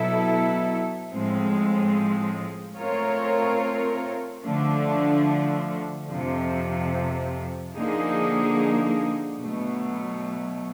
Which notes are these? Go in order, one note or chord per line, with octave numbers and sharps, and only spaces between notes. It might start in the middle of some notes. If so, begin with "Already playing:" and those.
Already playing: B2 F#3 B3 E4 A4
A2 F3 G#3 C4
A3 C4 F4 A#4 C#5
D3 F3 A3 D4
F2 C3 F3
D3 F3 A#3 D#4 G#4
B2 F#3 A3